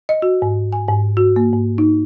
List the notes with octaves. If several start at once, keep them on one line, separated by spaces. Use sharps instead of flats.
D#5
F#4
G#2
G#5
G#2
F#4
A#3
G#2
D#4